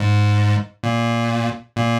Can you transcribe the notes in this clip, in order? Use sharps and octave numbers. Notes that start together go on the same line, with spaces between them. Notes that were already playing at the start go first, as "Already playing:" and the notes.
Already playing: G#2
A#2
A#2